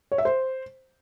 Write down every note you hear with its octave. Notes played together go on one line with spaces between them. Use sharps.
C#5
E5
C5